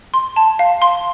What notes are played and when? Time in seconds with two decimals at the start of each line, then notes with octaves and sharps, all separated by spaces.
0.14 C6
0.36 A5
0.59 F5
0.82 C6